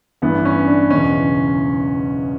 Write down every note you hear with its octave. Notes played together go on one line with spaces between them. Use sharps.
A1 G2 E3 B3
C#4
D4
F#1 E2 B2 C#4